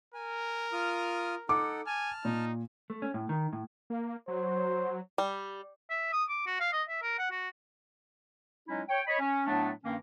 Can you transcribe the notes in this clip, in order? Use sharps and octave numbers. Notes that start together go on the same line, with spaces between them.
A#4 G#5
F4 D#6 F6
D#4 A4 F#5 D6
G#5 A5 F6
A#2 D#4
A3
C#4
A2
D#3
A2
A#3
F#3 C5
G3
E5
D#6
D6
F#4
F5
D#5
E5
A#4
F#5
F#4
F#3 G#3 C#4 D#4 E4
C#5 G5
C#5 D#5 B5
C#4
A2 F#3 A3 B3 D4
G2 D#3 A#3 C#4